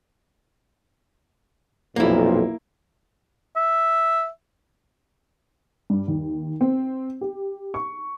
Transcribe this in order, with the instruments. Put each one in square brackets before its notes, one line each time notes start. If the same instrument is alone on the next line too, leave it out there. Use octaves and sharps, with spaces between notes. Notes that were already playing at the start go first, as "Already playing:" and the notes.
[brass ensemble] B1 F2 A#2 [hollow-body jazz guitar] A#3 E4
[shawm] E5
[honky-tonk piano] G2
D#2
C4
G4
C#6